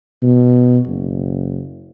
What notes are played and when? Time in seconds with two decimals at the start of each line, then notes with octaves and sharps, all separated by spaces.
0.23 B2
0.87 F#1